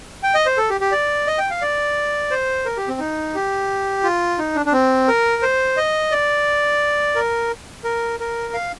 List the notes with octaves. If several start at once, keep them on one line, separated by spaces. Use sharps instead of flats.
G5
D#5
C5
A4
G4
G4
D5
D#5
G5
F5
D5
C5
A#4
G4
C4
D#4
G4
F4
D#4
D4
D4
C4
A#4
C5
D#5
D5
A#4
A#4
A#4
F5